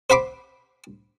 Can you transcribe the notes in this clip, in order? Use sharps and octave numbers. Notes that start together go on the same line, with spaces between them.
C5 F#5 B5 C6 D6